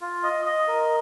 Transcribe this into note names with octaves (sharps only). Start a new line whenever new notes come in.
F4
D#5
D#5
A#4